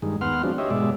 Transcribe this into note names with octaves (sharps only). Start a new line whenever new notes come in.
G2 D#3 G#3
D#2 B3 F#5 C6 F6
F3 G#3 C4 D4 F#4
G4 C#5 D#5 E5
G#2 B2 G#3 D5 E5